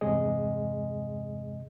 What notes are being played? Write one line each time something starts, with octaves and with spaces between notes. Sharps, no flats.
E2 G2 C3 G#3 G#4 D#5